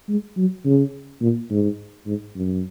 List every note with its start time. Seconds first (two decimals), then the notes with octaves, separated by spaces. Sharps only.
0.09 G#3
0.37 F#3
0.65 C#3
1.21 A#2
1.50 G#2
2.06 G#2
2.35 F#2